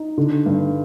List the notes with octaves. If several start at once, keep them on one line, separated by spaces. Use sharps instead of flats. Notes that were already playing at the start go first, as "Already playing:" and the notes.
Already playing: D#4
D3
G2